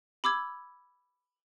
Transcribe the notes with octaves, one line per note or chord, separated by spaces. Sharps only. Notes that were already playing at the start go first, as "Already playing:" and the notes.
B5 D6 E6 G#6